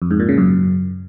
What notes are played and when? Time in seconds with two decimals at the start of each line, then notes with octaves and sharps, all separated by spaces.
0.02 F2
0.11 G#2
0.20 A#2
0.29 C#3
0.38 F#2